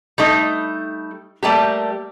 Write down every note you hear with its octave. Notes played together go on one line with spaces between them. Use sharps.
G3 A3 D#4
G3 A3 A#3 G4